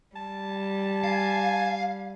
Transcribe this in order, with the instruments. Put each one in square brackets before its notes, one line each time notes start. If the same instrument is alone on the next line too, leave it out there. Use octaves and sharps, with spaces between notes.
[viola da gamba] G3 [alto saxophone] A5
[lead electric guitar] F5 [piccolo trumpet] G#5